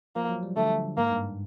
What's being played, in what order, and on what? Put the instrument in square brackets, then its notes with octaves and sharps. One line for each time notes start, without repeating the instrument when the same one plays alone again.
[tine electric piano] F3 [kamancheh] A#3
[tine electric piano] F#3
G3
[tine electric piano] D3 [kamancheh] A3
[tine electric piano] G#2 [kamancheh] A#3
[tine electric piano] G2